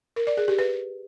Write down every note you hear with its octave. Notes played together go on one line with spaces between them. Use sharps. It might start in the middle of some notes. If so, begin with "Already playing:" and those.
A#4
D5
G#4
G4
B4